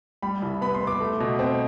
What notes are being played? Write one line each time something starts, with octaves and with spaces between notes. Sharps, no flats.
G3 B5
C2
B3 B5
C6
B3
D6
A3
B2
C4